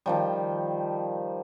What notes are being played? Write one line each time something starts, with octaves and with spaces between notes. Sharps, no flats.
D#3 F3 G3